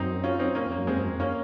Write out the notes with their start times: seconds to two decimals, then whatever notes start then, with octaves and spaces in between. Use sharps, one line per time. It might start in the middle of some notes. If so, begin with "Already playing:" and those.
Already playing: F#2 C4 D#4
0.24 C#4 F4
0.39 C4 D#4
0.55 A#2 A#3 C#4
0.66 F2
0.72 A#3
0.77 F#2
0.87 F2 G#3 C4
0.98 F#2
1.08 F2
1.20 A#3 C#4